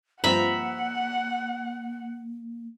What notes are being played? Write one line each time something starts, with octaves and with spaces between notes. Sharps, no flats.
G2 F3 A#3 C4 E5 F#5 A#5 B5